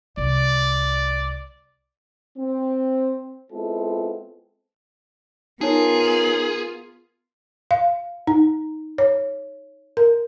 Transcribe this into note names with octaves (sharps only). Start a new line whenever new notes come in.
C2 D5
C4
G#3 B3 C4 E4 F4 A4
B3 D#4 F4 G#4 A#4 C#5
F5
D#4
C#5
A#4